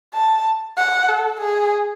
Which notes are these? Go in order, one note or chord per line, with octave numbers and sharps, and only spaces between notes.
A5
F#5
A4
G#4